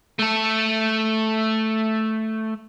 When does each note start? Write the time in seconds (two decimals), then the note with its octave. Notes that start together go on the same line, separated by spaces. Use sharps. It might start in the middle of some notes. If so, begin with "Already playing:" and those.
0.19 A3 A4